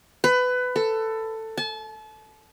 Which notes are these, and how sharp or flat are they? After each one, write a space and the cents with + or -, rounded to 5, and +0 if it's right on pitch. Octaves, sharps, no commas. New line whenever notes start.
B4 +20
A4 +15
A5 -35